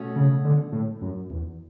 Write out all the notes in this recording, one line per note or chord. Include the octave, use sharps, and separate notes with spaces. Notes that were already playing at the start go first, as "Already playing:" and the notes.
Already playing: B2 A3 C#4 F#4
C#3
D3
A2
F#2
E2